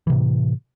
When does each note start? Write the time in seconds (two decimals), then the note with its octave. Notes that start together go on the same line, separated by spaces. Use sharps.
0.07 E3
0.10 C3
0.13 A2